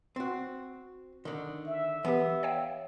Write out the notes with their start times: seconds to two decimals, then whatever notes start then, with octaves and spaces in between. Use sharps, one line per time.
0.16 C4 F#4
1.25 D3 D#3
1.67 E5
2.05 E3 B3 G4
2.43 C#5 F5 G5